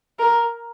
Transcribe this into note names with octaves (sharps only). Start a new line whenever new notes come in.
A#4